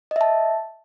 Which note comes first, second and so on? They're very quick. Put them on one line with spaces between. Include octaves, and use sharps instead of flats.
D#5 E5 A5